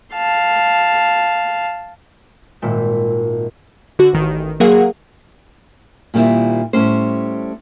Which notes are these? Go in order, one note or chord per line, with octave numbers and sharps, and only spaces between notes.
F5 A5
G#1 A#2 E5
D3 F#4
A1 D#3
F#3 A#3 G#4 A#4 F5 F#5
A#2 D#3 G3 C4 E4
A2 G3 C#4 C5